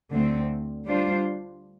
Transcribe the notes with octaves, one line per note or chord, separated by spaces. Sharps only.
D2 D3 A3 C4
G3 D4 F4 C5